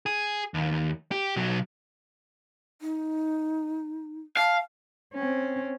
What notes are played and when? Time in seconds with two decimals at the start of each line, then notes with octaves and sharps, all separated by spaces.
0.06 G#4
0.54 D#2
1.11 G4
1.36 B1 F#3
2.81 D#4
4.37 F5 A5
5.14 C4 C#4